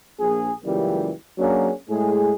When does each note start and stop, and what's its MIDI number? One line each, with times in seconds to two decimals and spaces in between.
0.20 0.51 34
0.20 0.51 68
0.65 1.10 37
0.65 1.10 42
0.65 1.10 52
0.65 1.10 55
0.65 1.10 58
0.65 1.10 67
1.38 1.72 54
1.38 1.72 58
1.38 1.72 61
1.38 1.72 62
1.38 1.72 66
1.38 1.72 68
1.90 2.33 45
1.90 2.33 56
1.90 2.33 57
1.90 2.33 68